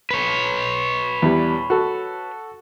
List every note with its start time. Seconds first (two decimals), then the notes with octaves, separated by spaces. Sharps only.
0.11 B4 C#5
1.22 E2 G3
1.70 F#4 A4